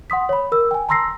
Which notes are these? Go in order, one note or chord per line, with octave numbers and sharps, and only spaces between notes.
F#5 C6 D#6 B6
C#5 B5
A#4 E6
G5 G#5
A5 A#5 C6 E6 A#6 C7